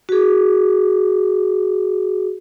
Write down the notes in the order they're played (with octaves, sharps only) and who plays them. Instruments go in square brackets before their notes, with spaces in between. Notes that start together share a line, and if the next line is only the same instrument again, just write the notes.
[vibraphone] F#4 G#4